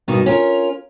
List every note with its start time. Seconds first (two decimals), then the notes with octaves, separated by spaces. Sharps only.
0.08 G2 B2 D#3 D4 D#4
0.26 C#4 F4 A#4